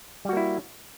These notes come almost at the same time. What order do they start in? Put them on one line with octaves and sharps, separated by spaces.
G3 F#4 A#3 E4